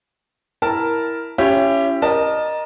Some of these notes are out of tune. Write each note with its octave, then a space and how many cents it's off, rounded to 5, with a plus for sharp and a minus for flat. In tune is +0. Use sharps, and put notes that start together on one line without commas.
E4 +0 A#4 +0 A5 +0
C#4 +0 E4 +35 G4 +0
A#4 +15 D#5 -15 A5 +0